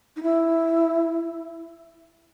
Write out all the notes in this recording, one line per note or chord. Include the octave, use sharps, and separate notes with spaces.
D#4
E4